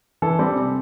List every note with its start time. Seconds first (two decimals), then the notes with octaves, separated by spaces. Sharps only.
0.22 E3 A4
0.39 G3 C4
0.56 C3